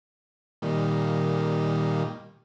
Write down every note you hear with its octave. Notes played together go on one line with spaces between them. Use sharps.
A#2 D#3 G3